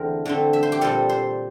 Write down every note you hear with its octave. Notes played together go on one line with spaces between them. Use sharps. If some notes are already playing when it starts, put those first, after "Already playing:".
Already playing: E2 D3 A3 C4 A#4 C5
D3 A3 C4
E5
C5
G4
A#2 G3 C4 A4
C5